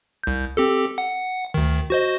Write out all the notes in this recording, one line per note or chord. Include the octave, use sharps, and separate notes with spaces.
C2 G6
C4 G4 A4
F#5
D2 D#3
F#4 C5 D#5